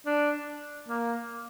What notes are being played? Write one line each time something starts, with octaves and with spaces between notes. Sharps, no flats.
D4
A#3